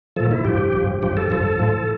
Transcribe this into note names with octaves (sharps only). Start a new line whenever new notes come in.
A#2 F3 A4
E4
G2 F3 G4
G2 F3
G2 F3 G4
A4
G2 F3 A4
A2 F3